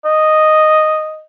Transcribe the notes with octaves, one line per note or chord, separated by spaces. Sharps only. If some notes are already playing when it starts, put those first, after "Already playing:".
D#5